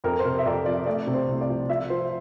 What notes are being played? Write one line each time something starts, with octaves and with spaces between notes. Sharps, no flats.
F2 A#4
C5
C3 A#4
E5
F2 D5
F3 D5
A3 D5
C3
C5
C2
D5
F3
F4 E5
F3 C5